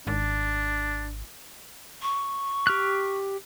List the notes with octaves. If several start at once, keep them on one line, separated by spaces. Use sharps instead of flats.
G#1 D4
C#6
G4 F6 F#6